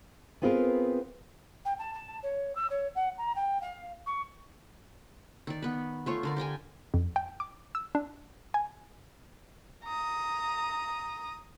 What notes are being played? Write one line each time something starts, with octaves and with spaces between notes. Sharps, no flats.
B3 C4 F4 G#4 A#4 B4
G5
A5
A5
C#5
E6
C#5
F#5
A#5
G5
F5
C#6
D#3 D5
B3 B4
A3 F4 C#5
D3 A#4 D5
G4 D5 G5 G#5
F2
G5
D6
E6
D4
G#5
A#5 D#6